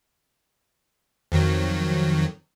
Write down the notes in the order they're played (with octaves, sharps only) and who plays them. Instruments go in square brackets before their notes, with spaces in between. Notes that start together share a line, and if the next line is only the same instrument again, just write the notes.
[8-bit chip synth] F2 D#3 F#3